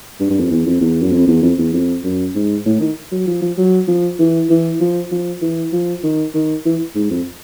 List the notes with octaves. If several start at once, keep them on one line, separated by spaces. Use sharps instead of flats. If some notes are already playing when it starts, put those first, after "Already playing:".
G2
G2
F2
E2
F2
E2
F#2
F2
E2
F2
E2
F2
F#2
G#2
A2
D#3
F#3
F3
F3
F#3
F3
E3
E3
F3
F3
E3
F3
D#3
D#3
E3
G#2
F2